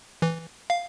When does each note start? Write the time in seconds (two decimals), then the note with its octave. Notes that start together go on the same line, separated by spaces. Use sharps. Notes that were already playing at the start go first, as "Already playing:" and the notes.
0.22 E3
0.70 F5